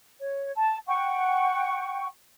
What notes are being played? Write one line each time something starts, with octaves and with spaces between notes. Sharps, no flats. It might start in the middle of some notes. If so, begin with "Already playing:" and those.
C#5
A5
F#5 G5 C#6